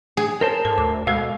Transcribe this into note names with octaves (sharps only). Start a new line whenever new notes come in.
G#4
A#4 C5 C#5 A5
G#2 A4
D2 D6
B2 G#3 A4 F5 E6